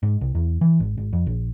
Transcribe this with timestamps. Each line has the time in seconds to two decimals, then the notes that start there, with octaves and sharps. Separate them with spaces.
0.03 G#2
0.21 C2
0.35 E2
0.61 E3
0.80 G#1
0.98 G#1
1.13 F2
1.27 A#1